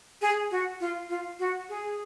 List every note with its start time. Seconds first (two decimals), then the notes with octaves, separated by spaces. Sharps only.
0.22 G#4
0.51 F#4
0.80 F4
1.09 F4
1.39 F#4
1.69 G#4